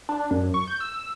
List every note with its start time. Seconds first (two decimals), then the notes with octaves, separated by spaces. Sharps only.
0.09 D4
0.31 F#2
0.54 C#6
0.67 G6
0.80 E6